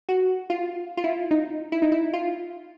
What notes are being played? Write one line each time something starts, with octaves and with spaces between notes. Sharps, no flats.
F#4
F4
F4
E4
D#4
E4
D#4
E4
F4